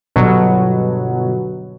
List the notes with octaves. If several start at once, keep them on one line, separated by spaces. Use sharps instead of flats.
G1 B2 F#3